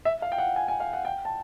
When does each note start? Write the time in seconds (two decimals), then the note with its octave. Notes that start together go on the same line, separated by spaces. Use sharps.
0.05 E5
0.22 F5
0.32 G5
0.38 F#5
0.56 G#5
0.68 G#5
0.80 F5
0.93 F#5
1.05 G5
1.25 A5